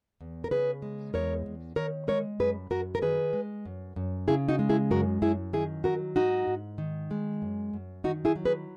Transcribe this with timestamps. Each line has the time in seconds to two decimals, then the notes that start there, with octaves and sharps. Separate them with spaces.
0.21 E2
0.44 A#4
0.51 C#3 G#4 B4
0.82 G#3
1.14 E2 A#4 C#5
1.46 E2
1.76 D#3 A#4 C#5
2.08 G#3 A#4 C#5
2.40 F#2 G#4 B4
2.70 F#2 F#4 A#4
2.95 A#4
3.02 D#3 G#4 B4
3.33 G#3
3.65 F#2
3.96 F#2
4.28 C#3 E4 G#4
4.49 D#4 F#4
4.59 G#3
4.70 E4 G#4
4.91 F#2 F#4 A#4
5.22 F#2 E4 G#4
5.53 D#3 E4 G#4
5.84 F#3 F#4 A#4
6.16 G#2 D#4 F#4
6.47 G#2
6.78 D#3
7.11 G#3
7.42 F#2
7.73 F#2
8.04 D#3 D#4 F#4
8.25 E4 G#4
8.36 F#3
8.45 G#4 B4